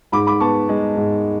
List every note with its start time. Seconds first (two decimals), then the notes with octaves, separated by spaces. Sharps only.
0.12 G#2 B5 D6
0.27 B5 D6
0.40 B3 A5 C#6
0.69 G#3
0.96 G#2